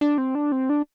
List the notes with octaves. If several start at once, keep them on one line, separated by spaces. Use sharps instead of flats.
D4
C4
D4
C4
D4